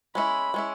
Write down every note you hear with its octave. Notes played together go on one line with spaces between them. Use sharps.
G#3 C#4 E4 B5
G#3 C#4 E4